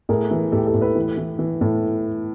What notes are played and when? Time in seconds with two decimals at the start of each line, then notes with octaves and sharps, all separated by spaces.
0.09 A2 G#4 A#4
0.31 E3
0.52 A2 G4 A4
0.67 G4 A4
0.74 A2
0.81 A4 B4
0.95 E3
1.17 E3
1.39 E3
1.61 A2